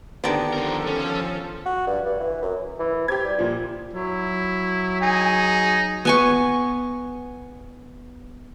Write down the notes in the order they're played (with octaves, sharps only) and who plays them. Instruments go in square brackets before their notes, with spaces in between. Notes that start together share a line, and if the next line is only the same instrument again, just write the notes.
[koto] D3 D#3 [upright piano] B3 D4 G4 [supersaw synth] C#7
[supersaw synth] F3 A4 [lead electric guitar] C4 A#4
[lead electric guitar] C#4
[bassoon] F#4
G2
G2
E3
F#2
E3
[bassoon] C3 [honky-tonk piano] G4 G#6
[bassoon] G3
[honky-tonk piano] A#2 F3
[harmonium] F#3 [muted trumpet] E4
[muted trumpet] D#4 [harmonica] G#4
[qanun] B3 G#5 C#6